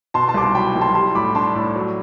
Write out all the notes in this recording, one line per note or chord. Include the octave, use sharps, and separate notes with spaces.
B2 A5 C6
A5 C6
C2 D6
A5 C6
F#3 G5 B5
C2
A5 C6
G3 A5 C6
A2 B5 D6
D4 A5 C6
A2
F#3